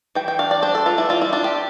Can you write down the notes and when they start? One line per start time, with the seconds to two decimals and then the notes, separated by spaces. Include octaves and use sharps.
0.15 E3 G5
0.28 G5
0.39 D4 F5
0.51 D5
0.62 D4 C5
0.75 A4
0.85 E3 F4
0.98 E4
1.09 G3 F4
1.22 E4
1.33 D4 F4
1.44 G4